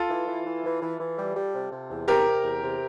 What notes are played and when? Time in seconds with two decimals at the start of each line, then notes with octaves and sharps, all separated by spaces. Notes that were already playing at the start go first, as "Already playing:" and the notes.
Already playing: F4 A4
0.09 E3
0.27 E3
0.45 E3
0.64 E3
0.82 E3
0.99 E3
1.18 G3
1.35 G3
1.53 C3
1.71 C3
1.89 E2
2.08 C3 G4 A#4
2.25 C3
2.43 E2
2.62 C3